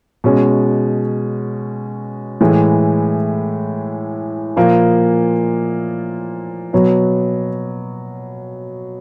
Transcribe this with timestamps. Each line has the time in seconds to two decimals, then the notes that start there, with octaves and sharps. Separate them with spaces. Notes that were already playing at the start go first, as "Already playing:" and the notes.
0.24 B2 G#3 C#4
2.41 A2 E3 G#3
4.56 A#2 F3 A#3
6.73 B2 F#3 B3